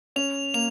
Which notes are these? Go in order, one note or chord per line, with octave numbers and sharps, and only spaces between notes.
C#4 F7
A#3 F7